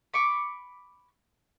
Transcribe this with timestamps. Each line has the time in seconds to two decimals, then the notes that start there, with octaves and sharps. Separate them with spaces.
0.14 B5 C#6 D6